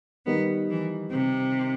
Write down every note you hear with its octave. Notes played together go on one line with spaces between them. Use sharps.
D#3 G3 B3 D#4
E3
C3